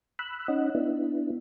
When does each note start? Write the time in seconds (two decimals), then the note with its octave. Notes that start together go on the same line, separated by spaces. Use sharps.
0.19 B5 E6 F#6
0.48 C#4 D#4 D#5 F#5
0.75 B3 D4 E4